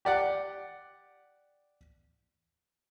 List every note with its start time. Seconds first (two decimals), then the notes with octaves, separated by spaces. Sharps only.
0.05 G4 D5 F#5